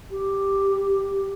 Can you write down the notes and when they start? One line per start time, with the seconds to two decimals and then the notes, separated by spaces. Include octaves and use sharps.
0.11 G4